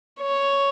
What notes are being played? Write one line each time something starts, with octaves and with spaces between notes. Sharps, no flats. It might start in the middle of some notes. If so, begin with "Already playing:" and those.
C#5